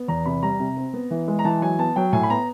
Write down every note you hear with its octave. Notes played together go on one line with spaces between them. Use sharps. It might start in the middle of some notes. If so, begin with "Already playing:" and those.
Already playing: B3
E2 A#5
C3 B5
G3 A#5
C3
C4
B3
E3
G#3
A#5
E3 A5
F#3 G#5
B3 A5
F#3 G5
A2 G#5
B5
B3 A#5